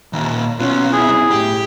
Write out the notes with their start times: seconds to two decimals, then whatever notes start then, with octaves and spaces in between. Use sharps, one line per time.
0.13 D#2 A#2
0.59 B1 B3 C#4 F4
0.93 E4 G#4
1.31 A2 G4